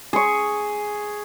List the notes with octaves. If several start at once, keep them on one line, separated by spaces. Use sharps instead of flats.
G#4 C#6